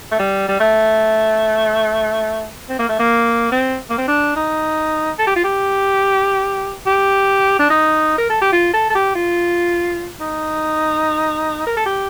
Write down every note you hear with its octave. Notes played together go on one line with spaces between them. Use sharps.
A3
G3
G3
A3
C4
A#3
A3
A#3
C4
A#3
C4
D4
D#4
A4
G4
F4
G4
G4
D4
D#4
A#4
A4
G4
F4
A4
A4
G4
F4
D#4
A#4
A4
G4